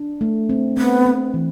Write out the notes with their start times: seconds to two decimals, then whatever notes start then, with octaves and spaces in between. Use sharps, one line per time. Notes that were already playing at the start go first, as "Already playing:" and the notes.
Already playing: D4
0.21 A3
0.49 C4
0.77 B3 C4
1.06 C4
1.34 E3